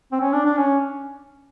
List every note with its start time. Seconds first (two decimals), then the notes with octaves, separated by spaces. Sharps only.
0.12 C4
0.21 C#4
0.33 D4
0.45 D4
0.57 C#4